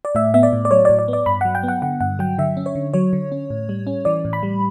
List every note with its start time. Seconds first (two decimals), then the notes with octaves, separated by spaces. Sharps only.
0.05 D5
0.15 A2 E5
0.34 B3 E5
0.43 D5
0.53 A2
0.65 D5
0.71 F#3 C#5
0.85 A2 D5
0.99 D5
1.08 B3
1.13 D5
1.26 G2 B5
1.41 F#3 F#5
1.55 G5
1.63 B3
1.68 F#5
1.82 D3 F#5
2.01 G2 F#5
2.19 F#3 G5
2.38 D3 E5
2.57 C#4
2.66 C#5
2.75 D3
2.94 F#3 C#5
3.13 D3
3.32 C#4
3.50 A2
3.69 G3
3.87 C#4
4.05 E3 D5
4.25 A2
4.33 B5
4.43 G3